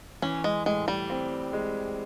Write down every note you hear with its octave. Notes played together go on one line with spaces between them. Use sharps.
E3 C#4
G#3
A2 G#3
G3
C4
G#3